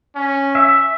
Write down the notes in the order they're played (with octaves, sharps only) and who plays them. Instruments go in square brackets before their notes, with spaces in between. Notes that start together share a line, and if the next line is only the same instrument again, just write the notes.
[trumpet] C#4
[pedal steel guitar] E5